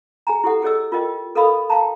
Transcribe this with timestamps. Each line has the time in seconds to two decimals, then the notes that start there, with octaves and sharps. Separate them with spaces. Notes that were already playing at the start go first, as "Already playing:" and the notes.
0.27 G#4 G#5 A#5
0.44 E4 G4 A4 F#5
0.62 G#4 A4 C#5 D#5 E6
0.92 F4 A#4 D#5 G5
1.35 A4 A#4 D#5 F5 B5 D#6
1.69 F5 G5 A5 A#5